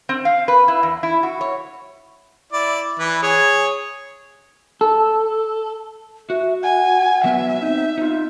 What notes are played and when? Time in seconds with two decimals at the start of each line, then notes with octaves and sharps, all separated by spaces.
0.09 C4
0.25 F5
0.48 B4
0.68 E4
0.83 E2
1.03 E4
1.23 F#4
1.41 C#5
2.52 E4 D5
2.99 E3 B4
3.23 G#4 C#5
4.81 A4
6.30 F#4 E5
6.63 F#5 G#5
7.24 F#3 B3 E5 G#5
7.62 C4 D#4
7.98 B3 D#4 F4